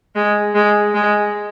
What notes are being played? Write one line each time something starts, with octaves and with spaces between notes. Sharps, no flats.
G#3
G#3
G#3